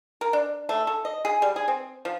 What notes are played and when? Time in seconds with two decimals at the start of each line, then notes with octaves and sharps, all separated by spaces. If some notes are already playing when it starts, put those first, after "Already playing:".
0.21 A#4
0.33 D4
0.69 A3
0.87 A4
1.05 D#5
1.25 G#4
1.42 G3
1.56 G#4
1.68 C4
2.05 F3